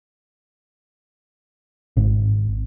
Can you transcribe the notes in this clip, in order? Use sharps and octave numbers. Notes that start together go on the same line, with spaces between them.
G#1